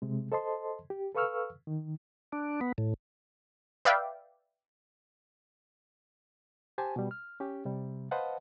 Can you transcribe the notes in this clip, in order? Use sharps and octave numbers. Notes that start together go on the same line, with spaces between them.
C3 G#3
A4 C5 D#5 A5 C6
G4
A4 B4 F5 C#6 E6 F6
D#3
D4
B3
A2
B4 D5 E5 F5 G5
G4 C5 G#5 A5
B2 G3
F6
C#4 G4
C3 G3
B4 C5 D#5 F5 F#5 A5